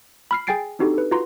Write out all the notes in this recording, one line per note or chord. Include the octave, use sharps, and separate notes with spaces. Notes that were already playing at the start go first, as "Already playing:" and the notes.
B5 F6 C7
G#4 G5 G#5 A6 C7 D7
C4 D4 D#4 F#4 G4 A4
A4 B4
F4 F#4 B4 A#5 C6